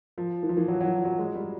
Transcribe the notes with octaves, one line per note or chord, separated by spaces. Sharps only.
F3
E3
F3
E3
F#3
F#3
F#3
G#3
G3